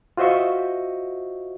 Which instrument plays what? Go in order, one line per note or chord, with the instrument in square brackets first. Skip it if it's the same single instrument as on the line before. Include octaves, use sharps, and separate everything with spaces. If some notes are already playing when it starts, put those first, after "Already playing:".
[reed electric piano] F4 F#4 C5 D#5 E5 C#6